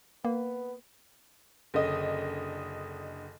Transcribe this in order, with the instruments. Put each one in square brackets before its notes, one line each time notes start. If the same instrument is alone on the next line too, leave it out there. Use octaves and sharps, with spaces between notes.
[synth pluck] A#3 [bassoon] B3
[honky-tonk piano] F#1 D3 D#5